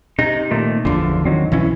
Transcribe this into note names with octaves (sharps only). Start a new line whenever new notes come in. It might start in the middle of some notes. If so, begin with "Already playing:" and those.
C3 D#4
A#2 D#3 A3
G#1 E2 D3 F3
D#3 F#3 C4
B1 G2 E3 C#4 E4